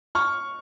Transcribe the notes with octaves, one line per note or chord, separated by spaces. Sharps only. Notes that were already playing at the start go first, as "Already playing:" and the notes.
C#6 F6